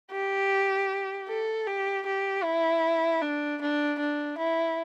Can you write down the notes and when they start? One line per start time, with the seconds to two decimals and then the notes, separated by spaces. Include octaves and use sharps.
0.12 G4
1.28 A4
1.67 G4
2.06 G4
2.44 E4
3.22 D4
3.61 D4
3.99 D4
4.38 E4